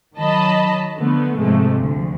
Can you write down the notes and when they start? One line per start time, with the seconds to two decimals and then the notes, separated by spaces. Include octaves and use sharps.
0.18 D#3 F#3 D#5 A5 B5
0.98 D3 F3 A3 B3
1.40 G#2 C3 F3 G#3 A3
1.75 D2 F3